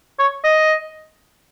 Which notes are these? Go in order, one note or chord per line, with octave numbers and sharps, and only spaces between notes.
C#5
D#5